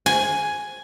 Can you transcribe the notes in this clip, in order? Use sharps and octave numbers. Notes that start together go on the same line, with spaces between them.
G#5